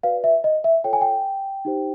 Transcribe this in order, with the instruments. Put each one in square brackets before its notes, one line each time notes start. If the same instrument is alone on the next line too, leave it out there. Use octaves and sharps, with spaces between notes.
[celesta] F#4 B4 D5 F5
E5
D#5
E5
F4 A4 C#5 G5
G#5
G5
D#4 G4 C5